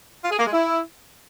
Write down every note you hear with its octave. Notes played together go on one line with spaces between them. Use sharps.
F4
G#4
A#3
G#3
E4